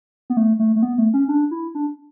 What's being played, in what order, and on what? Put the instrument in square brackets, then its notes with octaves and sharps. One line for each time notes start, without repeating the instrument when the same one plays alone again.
[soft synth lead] B3
A3
A3
A3
B3
A3
C#4
D4
E4
D4